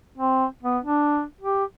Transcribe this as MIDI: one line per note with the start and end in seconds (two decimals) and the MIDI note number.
0.18 0.45 60
0.63 0.78 59
0.84 1.23 62
1.41 1.64 67